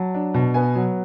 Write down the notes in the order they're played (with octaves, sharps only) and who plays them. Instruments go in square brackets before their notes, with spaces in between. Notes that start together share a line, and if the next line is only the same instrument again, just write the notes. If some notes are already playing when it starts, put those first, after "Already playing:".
Already playing: [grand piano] F#3 A5
D4
B2
B3 G#5
F#3